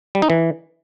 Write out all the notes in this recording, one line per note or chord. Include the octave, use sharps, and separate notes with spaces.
G3
D#4
E3